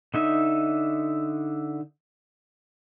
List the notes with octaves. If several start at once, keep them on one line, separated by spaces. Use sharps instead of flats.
D3 D#4 E5